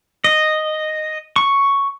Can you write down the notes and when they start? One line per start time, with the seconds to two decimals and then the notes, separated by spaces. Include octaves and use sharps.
0.24 D#5
1.36 C#6